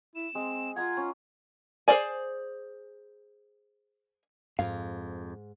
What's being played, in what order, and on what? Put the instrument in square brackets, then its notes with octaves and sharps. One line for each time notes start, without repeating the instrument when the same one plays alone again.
[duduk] E4 [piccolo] E7
[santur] G#3 [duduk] C4
[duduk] F4 [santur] F#5 A#5 D#6 [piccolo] G#6
[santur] C#4
[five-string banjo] G#4 A4 C5 D5 G#5
[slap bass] F2 [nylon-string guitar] G#2 [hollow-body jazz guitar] F5